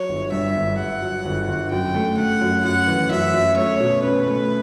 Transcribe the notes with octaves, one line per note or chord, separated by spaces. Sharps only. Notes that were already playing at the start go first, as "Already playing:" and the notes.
Already playing: F#3 C#5
G1
G2 E5
G1
G2 F#5
F#3
G1
G1
F#2 G5
A3
A3 F#5
F#2
F#2 F#5
E3
F#2 E5
F#2
A3 C#5
B2
C#4 B4
A3